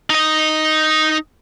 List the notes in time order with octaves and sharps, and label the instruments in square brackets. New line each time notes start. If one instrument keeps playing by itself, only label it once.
[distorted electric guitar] D#4 D#5